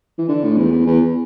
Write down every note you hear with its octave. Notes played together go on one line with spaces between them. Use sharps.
E3
D3
A2
E2
E2
E2